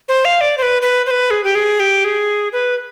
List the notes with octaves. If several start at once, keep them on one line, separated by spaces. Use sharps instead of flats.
C5
F5
D5
C5
B4
B4
C5
B4
G#4
G4
G#4
G4
G#4
B4